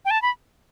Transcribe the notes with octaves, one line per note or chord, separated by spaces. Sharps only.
G5
A5
B5